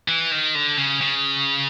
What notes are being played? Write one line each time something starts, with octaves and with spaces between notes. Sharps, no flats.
E3
D#3
D3
C#3
C#3